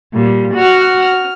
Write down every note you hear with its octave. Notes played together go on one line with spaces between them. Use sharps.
A#2 G3
F#4 F#5 F6
F6